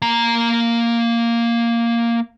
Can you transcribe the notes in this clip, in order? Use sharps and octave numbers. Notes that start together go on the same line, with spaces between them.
A#3 A#5